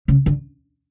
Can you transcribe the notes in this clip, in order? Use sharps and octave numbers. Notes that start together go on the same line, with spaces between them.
C#3
D3